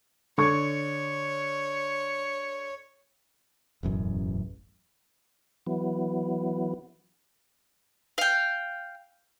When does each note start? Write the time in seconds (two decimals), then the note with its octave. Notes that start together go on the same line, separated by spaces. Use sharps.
0.38 D3 C#5 C#6 G#6
3.83 E1 A1 F#2
5.67 E3 F#3 B3
8.18 F5 G5